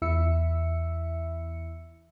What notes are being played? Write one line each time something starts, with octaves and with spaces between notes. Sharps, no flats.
E2 E4 E5 E6 C#7